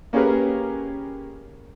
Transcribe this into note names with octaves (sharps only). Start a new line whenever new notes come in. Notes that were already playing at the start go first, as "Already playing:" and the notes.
A#3 C#4 G4 G#4 A#4 B4